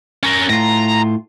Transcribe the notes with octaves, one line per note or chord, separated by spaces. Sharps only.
C#4 A#4
A2 F4 A#5